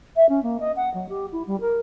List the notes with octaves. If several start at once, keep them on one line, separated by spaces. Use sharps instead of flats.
E5
C#4
A#3
D#5
F#5
F#3
G4
E4
G3
A#4